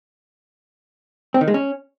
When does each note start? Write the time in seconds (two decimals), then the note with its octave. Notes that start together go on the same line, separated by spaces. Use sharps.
1.34 C4
1.41 D#3
1.48 G#3
1.54 C#4